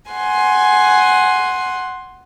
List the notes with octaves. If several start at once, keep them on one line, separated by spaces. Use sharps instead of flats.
F#5 G#5 C6